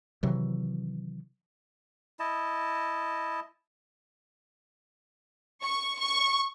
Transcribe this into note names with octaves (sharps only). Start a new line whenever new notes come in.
C3 D#3 E3 F#3
E4 D#5 A5
C#6
C#6